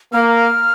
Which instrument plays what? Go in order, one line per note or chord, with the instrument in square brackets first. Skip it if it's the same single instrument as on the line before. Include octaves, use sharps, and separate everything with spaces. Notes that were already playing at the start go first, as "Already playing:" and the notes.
[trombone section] A#3 [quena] F6